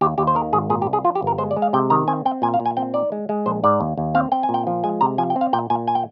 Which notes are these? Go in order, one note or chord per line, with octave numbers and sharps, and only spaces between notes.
D#2 G4
D#2 G4
C5
D#3 A#4
G#1 G#4
A#2 G#4
G4
C2
G#4
F3 F4
G4
G1 A#4
G#3 C5
D5
G#3
F5
C3 G5
D#3 A#5
C4 G#5
C4 G5
A#2 G#5
F5
A#2
G#5
C4 G5
D#4 D5
G#3
G#3
A#1 C5
G#2 D5
D#2
D#2
C4 F5
C4 G5
G#5
A#2
G5
F3
G#3 G#5
C3 A#5
F3 G#5
G5
C4
F5
A#2 G5
A#2 G#5
G#5
G5